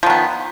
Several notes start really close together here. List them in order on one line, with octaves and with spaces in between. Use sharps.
F3 D#3 B3